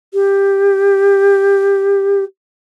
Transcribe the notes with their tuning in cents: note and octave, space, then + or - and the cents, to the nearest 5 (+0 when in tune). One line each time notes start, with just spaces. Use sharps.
G4 +15